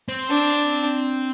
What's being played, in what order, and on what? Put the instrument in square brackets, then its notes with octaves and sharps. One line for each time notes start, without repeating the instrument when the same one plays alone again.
[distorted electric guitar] C4
[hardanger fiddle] D4